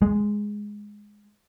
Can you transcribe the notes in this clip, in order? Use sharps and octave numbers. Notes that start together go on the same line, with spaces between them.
G#3